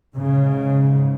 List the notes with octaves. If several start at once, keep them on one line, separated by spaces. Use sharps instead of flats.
G#2 C#3